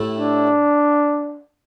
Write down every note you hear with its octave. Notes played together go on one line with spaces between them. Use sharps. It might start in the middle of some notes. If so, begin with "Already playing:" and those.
Already playing: A2 A3 E4 G4
D4